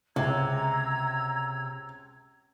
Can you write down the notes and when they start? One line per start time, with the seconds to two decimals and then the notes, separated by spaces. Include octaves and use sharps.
0.16 C#2 C3 A#5 E6 G#6